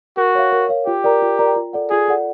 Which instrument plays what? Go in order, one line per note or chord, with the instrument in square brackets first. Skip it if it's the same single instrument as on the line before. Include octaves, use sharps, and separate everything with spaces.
[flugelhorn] F#4 [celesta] A#4
[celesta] C#5 F5
A#4
C#5 F5
[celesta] F4 [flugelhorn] G4
[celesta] A#4 D5 G5 A#5
F4
A#4 D5 G5 A#5
F4
A4 D5 F#5
[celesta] F4 [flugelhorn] G#4
[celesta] A4 D5 F#5